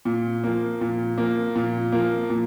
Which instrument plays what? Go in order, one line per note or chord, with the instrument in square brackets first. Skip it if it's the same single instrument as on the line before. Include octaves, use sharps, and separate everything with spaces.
[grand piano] A#2
F3 A#3
A#2
F3 A#3
A#2
F3 A#3
A#2